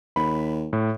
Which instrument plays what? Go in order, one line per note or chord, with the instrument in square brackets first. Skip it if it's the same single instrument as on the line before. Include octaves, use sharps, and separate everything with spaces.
[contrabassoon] D#2 [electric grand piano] B5
[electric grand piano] A2